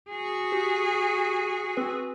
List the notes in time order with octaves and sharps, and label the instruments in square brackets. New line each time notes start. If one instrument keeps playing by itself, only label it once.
[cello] F#4 G#4
[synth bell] G4
C4 B4